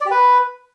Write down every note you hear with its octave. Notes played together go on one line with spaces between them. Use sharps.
D5
G4
B4